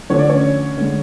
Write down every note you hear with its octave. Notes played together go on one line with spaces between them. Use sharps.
D3 F3 A3 C#5
D5
C#4 C#5
D3 G#3